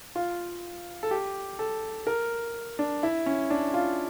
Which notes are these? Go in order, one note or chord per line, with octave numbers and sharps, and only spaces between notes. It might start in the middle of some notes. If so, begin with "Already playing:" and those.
F4
A4
G4
A4
A#4
D4
E4
C#4
D4
F4